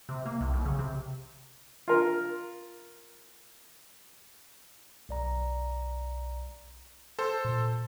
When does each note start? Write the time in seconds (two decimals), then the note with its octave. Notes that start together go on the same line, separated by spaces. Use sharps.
0.09 C3
0.26 A#3
0.41 C2
0.54 B1
0.65 C#3
0.79 C3
1.88 F4 A#4
5.09 B1 D5 A#5
7.19 A4 C5
7.45 A#2